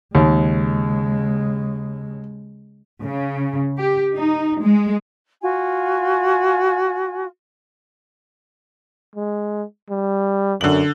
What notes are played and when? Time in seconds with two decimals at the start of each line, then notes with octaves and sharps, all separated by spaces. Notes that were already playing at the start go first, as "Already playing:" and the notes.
0.15 D#2 C#3 G#3
3.03 C#3
3.77 G4
4.15 D#4
4.60 G#3
5.42 F4 F#4 G#5
9.15 G#3
9.90 G3
10.61 F#2 D3 F#7